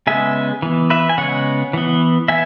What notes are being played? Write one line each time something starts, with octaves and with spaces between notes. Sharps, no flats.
C#3 G#3 B3 E5 G#5
E3 B3
B4 E5
G#5
C#3 G#3 B3 C#5 F#5
E3 B3
B3 E5 G#5